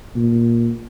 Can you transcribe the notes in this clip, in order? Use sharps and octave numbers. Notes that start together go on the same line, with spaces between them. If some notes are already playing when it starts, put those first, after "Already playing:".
A#2